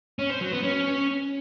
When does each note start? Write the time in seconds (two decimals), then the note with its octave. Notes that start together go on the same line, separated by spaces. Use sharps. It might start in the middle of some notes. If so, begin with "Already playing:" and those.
0.19 C#4
0.30 C5
0.41 F#3
0.52 B3
0.63 C#4